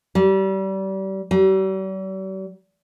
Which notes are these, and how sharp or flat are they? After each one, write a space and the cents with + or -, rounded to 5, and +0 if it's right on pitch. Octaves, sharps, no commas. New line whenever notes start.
G3 -30
G3 -45